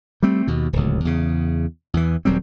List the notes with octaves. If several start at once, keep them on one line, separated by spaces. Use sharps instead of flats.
G3 A3 C4
D#2 B2
D1 C#2
E2 C#3
E2 E3
D#1 F#3 G3 C4